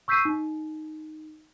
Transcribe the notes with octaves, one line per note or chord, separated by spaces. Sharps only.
C#6 E6 G6 B6 C7 D#7
D#4